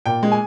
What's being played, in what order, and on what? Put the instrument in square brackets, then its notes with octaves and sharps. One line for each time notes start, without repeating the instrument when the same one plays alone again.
[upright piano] A#2 G5
G#3
G#5